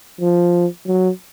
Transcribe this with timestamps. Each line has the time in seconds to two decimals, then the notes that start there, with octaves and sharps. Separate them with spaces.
0.21 F3
0.86 F#3